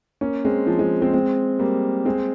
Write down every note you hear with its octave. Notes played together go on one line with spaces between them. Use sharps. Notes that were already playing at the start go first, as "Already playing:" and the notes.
A#3 C#4
G#3 C4
F3
F3 G#3
G#3 C4
G#3 C4
G3 A#3
G#3 C4